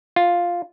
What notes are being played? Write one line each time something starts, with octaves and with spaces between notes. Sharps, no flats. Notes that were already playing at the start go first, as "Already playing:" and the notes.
F4